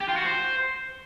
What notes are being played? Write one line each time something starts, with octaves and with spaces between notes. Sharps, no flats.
G4
F4
F#4
C5